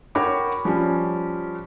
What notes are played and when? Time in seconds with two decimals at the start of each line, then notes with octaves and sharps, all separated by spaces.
0.15 F#4 A#4 C#5 G5 B5 D6
0.65 F3 G3 C#4